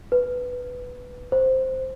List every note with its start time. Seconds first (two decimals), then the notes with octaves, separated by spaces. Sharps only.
0.12 B4
1.32 C5